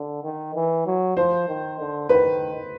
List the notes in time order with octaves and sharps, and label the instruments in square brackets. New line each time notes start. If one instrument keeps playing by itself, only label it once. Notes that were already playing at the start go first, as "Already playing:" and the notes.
Already playing: [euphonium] D3
D#3
E3
F#3
[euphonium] F3 [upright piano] C5
[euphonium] D#3
D3
[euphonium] D#3 [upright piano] B4